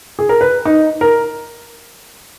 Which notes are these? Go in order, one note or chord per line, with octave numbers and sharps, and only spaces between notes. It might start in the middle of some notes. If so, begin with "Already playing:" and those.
G#4
A#4
B4
D#4
A#4